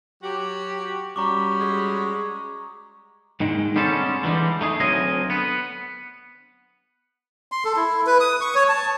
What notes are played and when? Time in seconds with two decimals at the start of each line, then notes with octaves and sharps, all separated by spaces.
0.23 F#3 F#4 G4
1.16 G3 C#4 F#4 A#5 C#6 D6
1.61 G#3
3.40 G#2 D#3 G#3
3.76 D3 G3 G#3 C4 C#4 A4
4.23 D3 E3 G3 G#3
4.61 A3 D#4 G#4
4.80 D2 F#3 C4 A#4 D#5 G#5
5.30 B3
7.52 C6
7.65 A4
7.76 E4
8.06 B4
8.20 D#6
8.41 C#6
8.55 C#5
8.69 A5